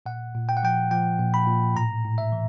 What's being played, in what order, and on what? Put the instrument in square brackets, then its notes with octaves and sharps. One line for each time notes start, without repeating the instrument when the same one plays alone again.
[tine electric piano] A#2 F#5
A#2
G5
F#5
F3 G5
F3 G5
A#2
B5
A#2
A2 A#5
A2
E5
E3